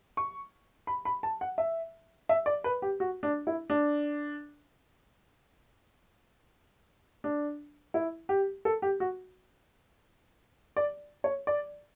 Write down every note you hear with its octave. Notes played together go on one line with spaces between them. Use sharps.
C#6
B5
B5
A5
F#5
E5
E5
D5
B4
G4
F#4
D4
E4
D4
D4
E4
G4
A4
G4
F#4
D5
C#5
D5